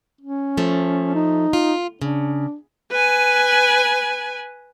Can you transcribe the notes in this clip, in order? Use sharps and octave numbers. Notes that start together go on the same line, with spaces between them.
C#4
F3 A3
D#4
F4
C#3 D4
B4 G#5